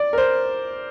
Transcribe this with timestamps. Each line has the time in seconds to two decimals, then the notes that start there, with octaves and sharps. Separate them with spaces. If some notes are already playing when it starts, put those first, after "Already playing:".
Already playing: D5
0.13 A#4
0.18 C5